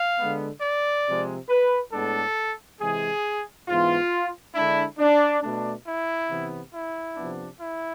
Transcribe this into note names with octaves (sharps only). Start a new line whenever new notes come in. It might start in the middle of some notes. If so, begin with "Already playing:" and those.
Already playing: F5
D3 G#3 B3
D5
C3 F3 G#3
B4
A2 G#3 B3 D4 A4
C3 E3 G#3 G#4
G#2 E3 B3 F4
D3 G#3 D4 E4
D4
B2 A3 D4
E4
C3 E3 B3
E4
C3 F3 B3 D4
E4